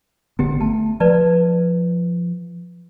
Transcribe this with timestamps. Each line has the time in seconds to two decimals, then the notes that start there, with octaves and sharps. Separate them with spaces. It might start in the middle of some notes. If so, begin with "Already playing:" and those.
0.39 G#1 D3 B3 G4 G5
0.61 A3 A5
1.00 F3 B4 D5 A5